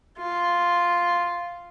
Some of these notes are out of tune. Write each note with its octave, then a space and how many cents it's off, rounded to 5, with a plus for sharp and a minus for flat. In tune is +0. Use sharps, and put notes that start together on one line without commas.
F4 +0